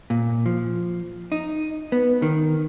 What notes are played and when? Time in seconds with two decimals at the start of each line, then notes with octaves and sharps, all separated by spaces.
0.10 A#2
0.46 F3
1.32 D#4
1.92 B3
2.22 D#3